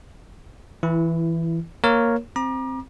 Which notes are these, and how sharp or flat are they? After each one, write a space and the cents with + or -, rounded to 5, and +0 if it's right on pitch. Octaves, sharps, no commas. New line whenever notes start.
E3 +0 E4 +20
A#3 +0 A#4 +0 C#5 +0
C4 +0 A#5 +35 D6 +35